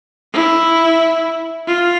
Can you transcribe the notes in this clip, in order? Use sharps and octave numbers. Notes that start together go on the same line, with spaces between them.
E4
F4